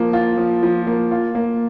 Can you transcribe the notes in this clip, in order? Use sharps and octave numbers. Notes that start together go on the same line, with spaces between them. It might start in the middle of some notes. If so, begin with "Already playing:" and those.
Already playing: F3 A#3
F4
F3
F3
A#3
F4
A#3